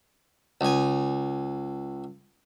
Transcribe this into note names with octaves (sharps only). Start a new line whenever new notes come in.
C#2 G#5